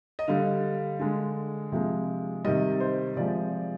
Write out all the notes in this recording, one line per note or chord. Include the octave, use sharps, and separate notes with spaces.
D#5
D3 G3 F5
D3 G#3
C3 F3 G#3
C3 D#3 G3 D#5
C5
C3 F3 G#3 D5